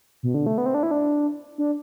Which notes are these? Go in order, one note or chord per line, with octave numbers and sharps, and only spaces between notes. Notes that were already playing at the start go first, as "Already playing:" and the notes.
B2
D3
A3
B3
C4
D4
E4
D4
D4